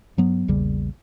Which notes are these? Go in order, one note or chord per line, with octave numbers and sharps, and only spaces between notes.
G2 F#3 B3
A#1 E2 C#3 G3